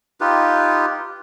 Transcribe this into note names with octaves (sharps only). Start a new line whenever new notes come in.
D#4 F4 G4 B4